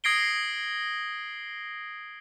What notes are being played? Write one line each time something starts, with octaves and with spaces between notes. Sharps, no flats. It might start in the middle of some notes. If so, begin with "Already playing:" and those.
D#6 G#6 A#6 C7 D7 G7